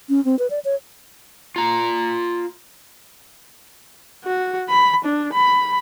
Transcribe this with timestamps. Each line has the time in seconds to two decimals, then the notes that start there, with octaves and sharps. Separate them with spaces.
0.09 C#4
0.25 C4
0.39 B4
0.50 D5
0.65 C#5
1.56 F4 A#5
4.24 F#4
4.69 B5
5.05 D4
5.33 B5